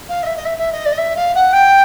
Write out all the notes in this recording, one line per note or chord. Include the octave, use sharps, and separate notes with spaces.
F5
D#5
E5
D#5
E5
E5
D#5
D5
D#5
E5
F5
F#5
G5